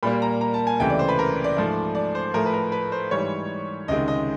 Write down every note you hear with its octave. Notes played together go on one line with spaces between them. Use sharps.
A#2 G3 A#3 B5
A#5
A#5
A5
G#5
C#2 C3 E3 A3 G5
D5
C5
B4
A#4
D5
G#2 F3 A3
D5
C5
A2 F3 A3 A#4
B4
A#4
B4
C5
G#2 E3 G3 C#5
C#2 C3 D#3 G#3 D#5
D#5